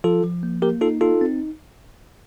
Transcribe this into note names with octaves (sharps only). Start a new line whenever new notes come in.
F3 F4 A4
F3
A#3
A#3 G4 A#4
D#4 F4 A4
D#4 F4 A4
C4